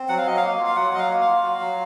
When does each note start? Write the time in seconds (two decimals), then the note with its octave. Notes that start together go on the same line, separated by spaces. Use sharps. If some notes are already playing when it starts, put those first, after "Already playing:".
Already playing: C4
0.09 F#3 F#5
0.18 F5
0.26 F#3 D#5
0.37 F5
0.43 A#3
0.59 F4
0.66 F5
0.76 F#3 F#5
0.93 F#3 D#5
0.99 F5
1.10 A#3
1.21 F5
1.27 F4
1.43 F#4
1.61 F#3